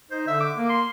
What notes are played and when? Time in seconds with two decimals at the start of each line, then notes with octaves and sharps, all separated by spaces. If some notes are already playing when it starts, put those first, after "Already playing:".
0.11 D#4 C5
0.28 D3 E5
0.41 D6
0.56 A#3
0.69 C6